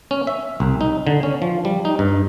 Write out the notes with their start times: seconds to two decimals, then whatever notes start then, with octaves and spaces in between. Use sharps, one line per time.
0.11 C#4
0.27 E5
0.60 C2
0.81 D#4
1.07 D3
1.23 C#4
1.42 F3
1.65 G3
1.85 D#4
1.99 G2